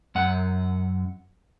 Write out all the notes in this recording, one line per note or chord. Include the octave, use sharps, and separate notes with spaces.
F#2 F#5